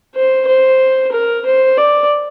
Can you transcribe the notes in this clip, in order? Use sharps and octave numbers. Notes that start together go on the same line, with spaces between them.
C5
C5
A#4
C5
D5